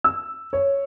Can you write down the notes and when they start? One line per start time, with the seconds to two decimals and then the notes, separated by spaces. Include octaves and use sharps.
0.04 E6
0.53 C#5